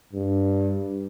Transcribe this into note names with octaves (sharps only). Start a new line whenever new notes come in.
G2